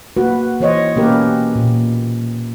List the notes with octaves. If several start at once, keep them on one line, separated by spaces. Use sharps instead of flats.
A#3 F#4 B4
E3 C5 C#5 D#5
B2 A#3 C#4 G4 A#4 B4
A#2